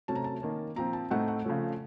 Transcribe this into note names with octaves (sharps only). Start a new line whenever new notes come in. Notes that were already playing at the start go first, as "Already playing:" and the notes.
C3 F#3 A3 C#4 A5
A#5
A5
D#3 A#3 C#4
A#2 F3 C4 A#5
A5
A2 A3 C4 D#4 F#5
F#5
C#3 F3 A3 C#4